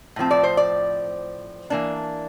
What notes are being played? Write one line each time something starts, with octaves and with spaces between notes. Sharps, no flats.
A2 F3 C4
D5
C5
D5
E3 A#3 D4